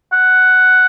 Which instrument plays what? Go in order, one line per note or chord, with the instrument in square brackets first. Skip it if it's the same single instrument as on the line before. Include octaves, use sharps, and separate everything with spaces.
[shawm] F#5